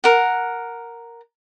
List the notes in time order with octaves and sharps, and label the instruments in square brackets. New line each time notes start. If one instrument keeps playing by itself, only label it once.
[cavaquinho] A#4 F#5